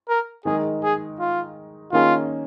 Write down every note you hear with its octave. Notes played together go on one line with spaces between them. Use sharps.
A#4
D#3 G#3 D#4 G#4 A#4
G#4
F4
D#3 A#3 C#4 F4 G#4